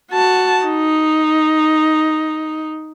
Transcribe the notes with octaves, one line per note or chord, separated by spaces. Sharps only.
F#4 A5
D#4